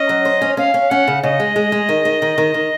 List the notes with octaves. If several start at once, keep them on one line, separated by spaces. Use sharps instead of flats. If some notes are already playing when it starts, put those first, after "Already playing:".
Already playing: C#4 D#5
F#3
C5
C#4
C#4 F5
C#4
C#4 F#5
C#3
C#3 D#5
G#3
G#3
G#3
D#3
D#3
D#3
D#3
D#3